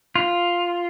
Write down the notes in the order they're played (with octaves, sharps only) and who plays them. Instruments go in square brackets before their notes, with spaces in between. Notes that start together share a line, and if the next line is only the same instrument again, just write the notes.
[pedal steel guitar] F4